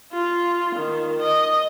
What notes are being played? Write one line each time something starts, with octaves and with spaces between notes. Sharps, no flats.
F4
D#3
D#5